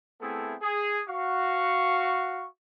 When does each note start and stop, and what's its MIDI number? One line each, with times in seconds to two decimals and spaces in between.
0.21 0.56 57
0.21 0.56 59
0.21 0.56 60
0.21 0.56 64
0.21 0.56 68
0.21 0.56 69
0.62 1.02 68
1.09 2.47 66
1.09 2.47 77
1.09 2.47 85